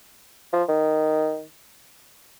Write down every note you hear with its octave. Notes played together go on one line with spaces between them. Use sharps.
F3
D#3